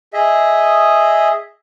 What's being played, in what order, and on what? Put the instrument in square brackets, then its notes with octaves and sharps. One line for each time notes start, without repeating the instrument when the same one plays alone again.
[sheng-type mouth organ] G#4 D#5 E5